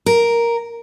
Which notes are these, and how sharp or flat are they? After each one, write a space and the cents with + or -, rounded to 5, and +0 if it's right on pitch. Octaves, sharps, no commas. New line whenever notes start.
A#4 +0